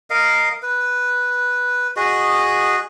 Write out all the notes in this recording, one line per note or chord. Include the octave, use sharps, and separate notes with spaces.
A#4 D#5 F5
B4
F#4 G#4 D#5